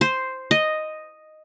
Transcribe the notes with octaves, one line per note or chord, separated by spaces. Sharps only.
C5
D#5